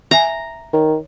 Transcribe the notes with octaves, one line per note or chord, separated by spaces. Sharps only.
E5 G#5 A#5
D#3 C#5